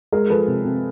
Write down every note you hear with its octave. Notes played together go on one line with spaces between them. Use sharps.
G#3 G#4 A#4
F3 A4 B4
C3
C3